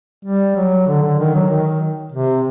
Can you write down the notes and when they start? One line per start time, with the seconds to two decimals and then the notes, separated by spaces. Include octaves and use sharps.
0.25 G3
0.56 F#3
0.87 D3
1.03 D3
1.19 D#3
1.34 F#3
1.50 D#3
2.12 C3